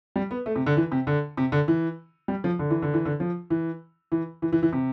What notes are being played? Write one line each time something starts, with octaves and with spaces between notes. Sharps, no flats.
G3
B3
A3
C3
D3
E3
C3
D3
C3
D3
E3
G3
F3
D3
E3
D3
E3
D3
F3
E3
E3
E3
E3
E3
C3